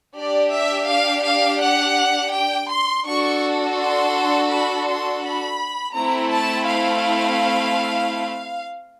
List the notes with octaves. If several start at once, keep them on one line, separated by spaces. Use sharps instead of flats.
D4 G4 D5
E5
F5
F5
F#5
G5
C6
D4 F#4 A4 C#6
C6
B5
C6
B5
A3 C4 E4 A#5
A5
F5